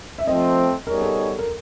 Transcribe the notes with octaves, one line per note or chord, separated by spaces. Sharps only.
E5
F3 A3 C4 D#5
G3 B3 D#4 G#4 A#4 C#5
A4
A#4